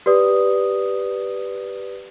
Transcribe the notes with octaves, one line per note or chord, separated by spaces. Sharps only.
G4 B4 D5 D#6